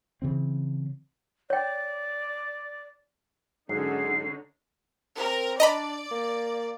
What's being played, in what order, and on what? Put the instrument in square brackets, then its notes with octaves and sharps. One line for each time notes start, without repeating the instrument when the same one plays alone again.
[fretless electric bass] C#3 E3 C4
[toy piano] C#5 G5 [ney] D5
[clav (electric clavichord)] G#2 F#3 [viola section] D3 C#4 D#4 [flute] G#4 [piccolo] C7
[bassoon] C4 [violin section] A#4
[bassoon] D4 [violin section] D5 [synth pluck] D#5 A#5 B5
[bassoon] A#3